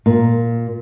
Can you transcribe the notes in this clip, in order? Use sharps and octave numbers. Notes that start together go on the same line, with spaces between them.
A#2